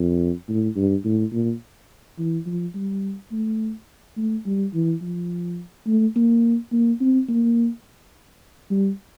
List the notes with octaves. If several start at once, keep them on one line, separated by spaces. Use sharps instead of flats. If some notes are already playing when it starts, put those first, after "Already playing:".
Already playing: F2
A2
G2
A2
A#2
E3
F3
G3
A3
A3
G3
E3
F3
A3
A#3
A#3
C4
A#3
G3